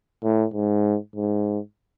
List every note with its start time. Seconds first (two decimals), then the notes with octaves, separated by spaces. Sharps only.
0.23 A2
0.53 G#2
1.16 G#2